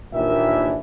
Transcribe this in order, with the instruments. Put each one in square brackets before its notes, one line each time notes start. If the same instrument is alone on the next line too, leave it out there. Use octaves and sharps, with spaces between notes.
[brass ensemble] D#2 A#2 D#3 E3 D4 E5